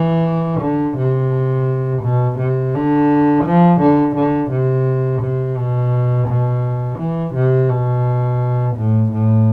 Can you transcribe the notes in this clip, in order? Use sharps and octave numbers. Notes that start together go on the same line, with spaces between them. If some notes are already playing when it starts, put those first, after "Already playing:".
Already playing: E3
D3
C3
B2
C3
D3
F3
D3
D3
C3
C3
B2
B2
E3
C3
B2
A2
A2